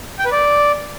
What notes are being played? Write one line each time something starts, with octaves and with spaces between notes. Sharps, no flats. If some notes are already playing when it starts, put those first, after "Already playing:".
G5
B4
D5